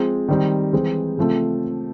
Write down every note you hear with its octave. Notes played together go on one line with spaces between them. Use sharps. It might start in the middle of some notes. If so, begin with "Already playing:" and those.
Already playing: F3 G#3 C4
D#3 G3 C4
E3 G#3 C4
C#3 F3 A3 C4